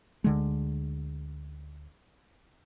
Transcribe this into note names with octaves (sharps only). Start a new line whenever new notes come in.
D2 D3 G#3